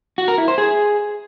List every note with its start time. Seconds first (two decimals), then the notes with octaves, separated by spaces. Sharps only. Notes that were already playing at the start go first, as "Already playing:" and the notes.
0.18 F#4
0.28 A#4
0.38 E4
0.48 C5
0.58 G#4